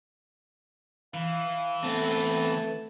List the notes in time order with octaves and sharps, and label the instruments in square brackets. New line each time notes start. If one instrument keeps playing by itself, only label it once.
[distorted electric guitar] E3 [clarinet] F5
[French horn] A3 [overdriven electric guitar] B3 C4 [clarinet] A5